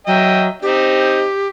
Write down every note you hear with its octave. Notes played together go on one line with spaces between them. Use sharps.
F#3 D#5 E5 G5
C4 D#4 G4